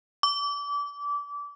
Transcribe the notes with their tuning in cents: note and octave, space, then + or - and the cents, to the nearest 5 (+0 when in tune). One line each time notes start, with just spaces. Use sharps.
D6 -30